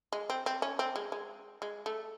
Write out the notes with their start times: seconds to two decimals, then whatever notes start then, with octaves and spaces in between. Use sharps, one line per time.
0.13 G#3
0.30 C4
0.46 C4
0.62 C#4
0.79 C4
0.96 G#3
1.12 G#3
1.62 G#3
1.86 A3